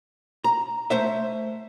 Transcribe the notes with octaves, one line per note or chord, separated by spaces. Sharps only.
A#5
A3 C5 E5